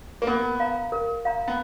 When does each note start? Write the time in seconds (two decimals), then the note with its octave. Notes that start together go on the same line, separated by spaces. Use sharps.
0.22 A#3
0.27 B3 A#4
0.60 F5 A#5
0.92 A#4
1.25 F5 A#5
1.48 B3